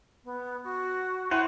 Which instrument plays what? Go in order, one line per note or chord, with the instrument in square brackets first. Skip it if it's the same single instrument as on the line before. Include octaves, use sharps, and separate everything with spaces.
[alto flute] B3
F#4
[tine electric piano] E4 [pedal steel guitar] C5 F#5 [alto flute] C#6